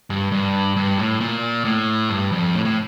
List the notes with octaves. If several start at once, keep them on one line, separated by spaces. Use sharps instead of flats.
G2
G2
G2
A2
A#2
A2
G2
F2
A2
A2